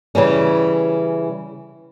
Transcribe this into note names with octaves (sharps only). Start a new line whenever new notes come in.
C#3 E3 G3 C#4